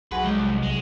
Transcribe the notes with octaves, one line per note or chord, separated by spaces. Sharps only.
B1 F#4 G#4 B4 C6
C2 G#3
C2 G#3